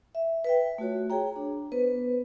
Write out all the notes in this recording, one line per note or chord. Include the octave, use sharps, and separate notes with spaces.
E5
B4 E5 G5
A3 F4 F#4 C#5
G#4 C#5 G5 A#5
D4
B3 B4 C5